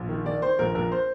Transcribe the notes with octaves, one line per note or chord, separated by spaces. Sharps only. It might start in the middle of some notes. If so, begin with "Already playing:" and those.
Already playing: A#1
D#3
D#3 D5
D#3 C5
A#1 A#4
A#1 A#4
C5